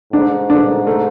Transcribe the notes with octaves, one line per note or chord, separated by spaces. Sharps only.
G#2 D4
D4
A3